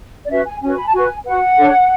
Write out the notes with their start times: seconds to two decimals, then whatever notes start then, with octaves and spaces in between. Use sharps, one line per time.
0.24 D5
0.30 C#4 F#4 B4 E5
0.46 G#5
0.62 C#4 F#4 B4 G#5
0.76 B5
0.84 A5
0.93 F#4 B4 G#5
1.25 F#4 B4 F#5
1.57 D4 A4 C#5